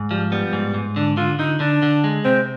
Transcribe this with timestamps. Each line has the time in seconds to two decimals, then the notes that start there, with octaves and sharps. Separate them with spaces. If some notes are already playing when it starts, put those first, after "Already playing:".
Already playing: G#2
0.11 F3 G3
0.32 G3 B3
0.53 G#2
0.74 G#2
0.96 D3 D4
1.17 D3 F4
1.39 D3 D#4
1.60 D3 D4
1.82 D3
2.04 G#3
2.25 C3 C4